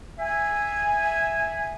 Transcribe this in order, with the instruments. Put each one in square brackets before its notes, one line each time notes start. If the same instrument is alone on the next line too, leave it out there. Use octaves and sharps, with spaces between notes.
[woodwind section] E5 G#5